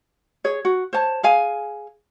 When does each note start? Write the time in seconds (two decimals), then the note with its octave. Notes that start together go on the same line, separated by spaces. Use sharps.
0.44 G#4 C#5
0.65 F#4
0.93 C5 C#5 A5
1.23 G#4 F5 G#5